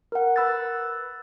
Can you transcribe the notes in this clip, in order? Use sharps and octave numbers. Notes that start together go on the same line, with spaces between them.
A#4 F#5
B4 B5 E6 F#6 A6